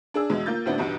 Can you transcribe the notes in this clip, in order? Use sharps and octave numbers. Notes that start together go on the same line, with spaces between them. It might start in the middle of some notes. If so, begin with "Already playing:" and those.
D4 G#4 E6
E2 B2 G#3
A#3 F4 G6 A6
D2 A2 F#3 B3 C4 D4
B1 E2 G2 B2